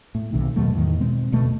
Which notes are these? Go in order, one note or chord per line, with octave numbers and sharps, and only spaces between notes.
A2
B1 C3 D#3
D#2 B2 F#3 A3
E2 A2 D#3
B2 G#3 C4
E1 D2 B2 A3